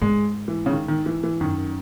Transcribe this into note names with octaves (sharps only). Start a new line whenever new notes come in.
G#2 G#3
E3
C#3
D#3
D#3
E3
E3
F#2 D#3